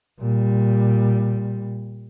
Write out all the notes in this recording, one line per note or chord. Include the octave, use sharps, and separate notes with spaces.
A#2 G3